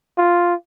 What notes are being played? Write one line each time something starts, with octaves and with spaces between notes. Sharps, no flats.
F4